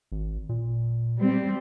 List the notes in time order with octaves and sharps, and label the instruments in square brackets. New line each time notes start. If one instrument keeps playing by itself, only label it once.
[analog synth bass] G#1
A#2
[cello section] G3 C4